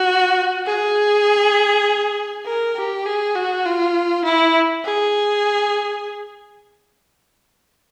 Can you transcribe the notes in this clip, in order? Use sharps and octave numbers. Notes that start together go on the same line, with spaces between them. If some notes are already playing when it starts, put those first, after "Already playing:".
Already playing: F#4
G#4
A#4
G4
G#4
F#4
F4
E4
G#4